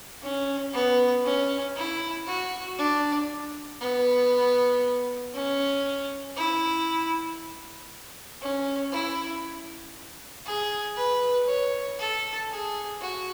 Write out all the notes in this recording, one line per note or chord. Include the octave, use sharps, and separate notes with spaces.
C#4
B3
C#4
E4
F#4
D4
B3
C#4
E4
C#4
E4
G#4
B4
C#5
A4
G#4
F#4